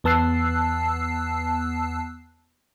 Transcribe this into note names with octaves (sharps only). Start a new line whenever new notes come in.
E2 B3 A5 E6 F#6 C7